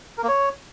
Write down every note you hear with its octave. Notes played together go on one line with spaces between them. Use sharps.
A#4
A#3
C#5